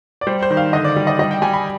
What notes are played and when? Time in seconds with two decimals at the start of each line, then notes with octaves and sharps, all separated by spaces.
0.21 D5
0.27 G3 C5
0.43 C5
0.50 D#3
0.57 F5
0.73 D3 D#5
0.84 D5
0.96 G3
1.07 D#5
1.19 G3 D#5
1.31 G5
1.42 G3 G#5
1.53 B5